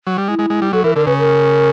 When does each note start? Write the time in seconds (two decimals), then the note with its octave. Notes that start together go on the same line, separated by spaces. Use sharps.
0.07 F#3
0.18 G3
0.28 G#3 E4
0.39 G#3
0.50 G#3
0.62 G3
0.73 F#3 A4
0.84 E3 A#4
0.96 D3 A#4
1.06 C#3 B4
1.19 A#4